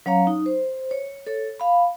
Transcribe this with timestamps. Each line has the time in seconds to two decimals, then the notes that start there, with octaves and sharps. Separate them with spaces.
0.06 F#3 C#4 C#5 F5 A#5
0.27 D#4
0.46 C5
0.91 C#5
1.26 A4 C#5
1.60 F5 B5